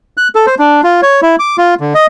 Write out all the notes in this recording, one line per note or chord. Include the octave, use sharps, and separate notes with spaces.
F#6
A4
C5
D4
F4
C#5
E4
D6
F4
D3
D#5